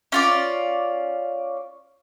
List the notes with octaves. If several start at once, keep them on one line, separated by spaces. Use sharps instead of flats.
C#4 F4 D5